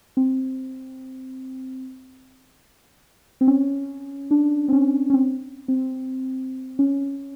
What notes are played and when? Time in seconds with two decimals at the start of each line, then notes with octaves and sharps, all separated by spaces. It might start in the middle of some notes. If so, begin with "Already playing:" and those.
0.17 C4
3.41 C4
3.48 C#4
4.31 D4
4.68 C4
4.73 C#4
5.10 C#4
5.14 C4
5.68 C4
6.79 C#4